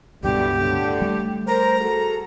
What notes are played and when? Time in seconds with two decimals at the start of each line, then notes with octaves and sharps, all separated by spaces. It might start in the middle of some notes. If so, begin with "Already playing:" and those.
0.23 C#2 G2 B2 D3 E3 G3 G4
0.58 A2 D3
1.02 G3 A3
1.47 A#4 C5 A#5
1.79 F#4 G#4 A4